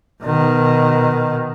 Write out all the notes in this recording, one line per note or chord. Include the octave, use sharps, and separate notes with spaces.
B2 D#3